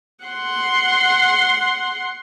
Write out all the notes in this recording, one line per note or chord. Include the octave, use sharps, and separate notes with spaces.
F#5 C6